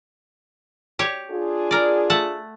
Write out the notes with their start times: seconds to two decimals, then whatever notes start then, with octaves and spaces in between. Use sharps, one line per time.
0.99 G4 C#5
1.30 D4 F4 G#4
1.71 A#4 D5
2.10 A3 F#5 A5